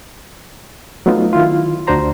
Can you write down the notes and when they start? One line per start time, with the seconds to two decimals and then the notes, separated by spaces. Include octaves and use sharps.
1.06 F#3 A3 B3 D#4 F4
1.33 D#3 E4 F4
1.87 D2 D4 F#4 C5 A#5 C6